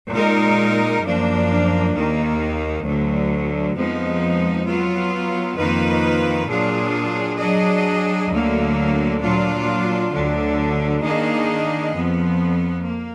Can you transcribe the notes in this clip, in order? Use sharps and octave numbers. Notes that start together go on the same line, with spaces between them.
A#2 G#3 D#4 A#4
F#2 F3 A#3 D4
D#2 D#3 A#3
D2 D3 F#3
F2 F3 G#3 B3 D#4
F#3 B3 F4
F2 D#3 A#3 F4 B4
A#2 F#3 D4 F4 G#4
F#3 D4 G#4 D#5
D2 D3 F#3 A#3
A#2 F#3 D4 F4
D2 D3 F#3 D4
D#3 A#3 D4 G#4 D#5
F2 F3 B3
A#3